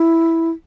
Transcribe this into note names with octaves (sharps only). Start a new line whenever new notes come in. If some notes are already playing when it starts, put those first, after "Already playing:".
Already playing: E4